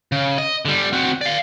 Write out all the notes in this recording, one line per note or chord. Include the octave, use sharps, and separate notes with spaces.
C#3
D#5
D3 G3
C4 F#4
D5 F5